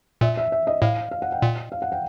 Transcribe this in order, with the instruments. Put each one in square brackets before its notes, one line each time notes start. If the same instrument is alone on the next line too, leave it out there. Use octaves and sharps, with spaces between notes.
[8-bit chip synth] A#2 [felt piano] E5
[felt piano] E5
E5
D#5
[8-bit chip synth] A2 [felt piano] F5
[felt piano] F5
F#5
G5
[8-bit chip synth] A#2
[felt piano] F5
F#5
G5